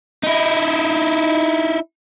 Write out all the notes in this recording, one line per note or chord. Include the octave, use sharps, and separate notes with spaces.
D#4 E4